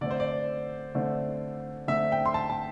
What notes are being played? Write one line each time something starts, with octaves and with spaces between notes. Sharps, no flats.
D3 A3 C4 D5
C5
D5
D3 A3 C4
D3 A3 C4 E5
G5
C6
A5
A5